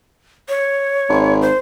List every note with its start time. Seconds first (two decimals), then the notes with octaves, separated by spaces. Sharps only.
0.49 C#5
1.09 G#1
1.42 C5